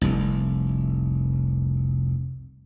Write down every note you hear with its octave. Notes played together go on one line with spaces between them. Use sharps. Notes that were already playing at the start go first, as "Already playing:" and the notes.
F1 C2